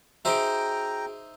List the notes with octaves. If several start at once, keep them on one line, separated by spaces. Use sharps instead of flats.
D#4 F#4 G#4 C5 E5 G5 A#5 D7